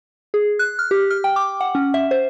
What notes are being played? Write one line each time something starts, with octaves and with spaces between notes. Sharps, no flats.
G#4
F#6
F6
G4
F6
G5
D6
F#5
C#4
E5
C5